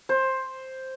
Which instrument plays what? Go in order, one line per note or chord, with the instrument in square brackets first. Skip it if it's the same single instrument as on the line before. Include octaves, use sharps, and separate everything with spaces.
[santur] C5